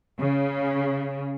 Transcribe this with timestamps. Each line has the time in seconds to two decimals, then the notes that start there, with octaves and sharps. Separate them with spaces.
0.20 C#3